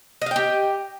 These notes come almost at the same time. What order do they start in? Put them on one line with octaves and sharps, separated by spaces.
D#5 F5 G5 G4